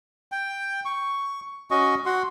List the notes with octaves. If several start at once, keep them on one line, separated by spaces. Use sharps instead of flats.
G5
C#6
C#4 F#4 D#5 C#6
F#4 F#5 C6